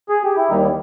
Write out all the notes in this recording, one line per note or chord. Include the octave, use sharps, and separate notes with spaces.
G#4
G4
E4
D#2 D#3 G3 A#3 D#4